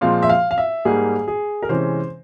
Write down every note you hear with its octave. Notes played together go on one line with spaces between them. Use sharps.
A#2 F3 G#3 C4 F5
E5
F5
F5
E5
G#2 G3 A#3 G#4
G#4
A#4
C3 E3 G#3 C#4 C5